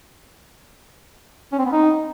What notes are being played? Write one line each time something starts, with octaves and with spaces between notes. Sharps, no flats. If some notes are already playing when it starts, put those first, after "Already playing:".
C#4
C4
B3
D#4